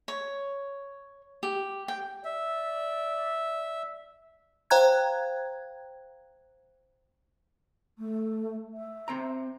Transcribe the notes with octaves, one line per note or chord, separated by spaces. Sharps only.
C#5
G4
G5
D5 E5
C5 F5 G5 A#5 F#6 G#6
A3
E5
C4 C5 A#5